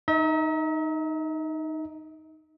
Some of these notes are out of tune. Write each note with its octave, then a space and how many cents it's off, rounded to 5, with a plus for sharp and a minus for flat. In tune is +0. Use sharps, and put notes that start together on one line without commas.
D#4 +0 E5 -45